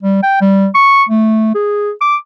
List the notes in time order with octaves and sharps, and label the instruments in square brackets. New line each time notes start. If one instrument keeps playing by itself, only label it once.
[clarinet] G3
G5
G3
C#6
A3
G#4
D6